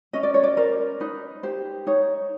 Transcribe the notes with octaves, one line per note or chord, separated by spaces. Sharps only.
C#4 D#5
D5
C#5
D5
A#4 C5
D#4 B4
G4 C5
D#4 C#5